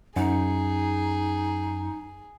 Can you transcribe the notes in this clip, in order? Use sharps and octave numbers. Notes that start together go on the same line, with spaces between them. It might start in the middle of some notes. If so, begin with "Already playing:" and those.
F#2 D#4 G#4